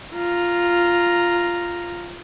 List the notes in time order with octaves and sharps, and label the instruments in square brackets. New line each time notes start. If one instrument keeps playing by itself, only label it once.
[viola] F4 A#5